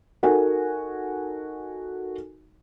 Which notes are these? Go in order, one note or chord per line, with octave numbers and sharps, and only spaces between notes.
D#4 F#4 A4 A#4 G#5